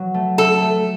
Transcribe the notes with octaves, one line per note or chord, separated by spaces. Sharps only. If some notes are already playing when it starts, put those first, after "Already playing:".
Already playing: F#3
A3
A3 A4
A3